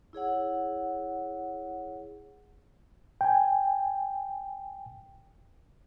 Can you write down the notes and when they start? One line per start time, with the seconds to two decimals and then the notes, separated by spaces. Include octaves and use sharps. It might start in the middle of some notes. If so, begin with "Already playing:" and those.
0.13 E4 G#4 C#5 F#5
3.21 G5 G#5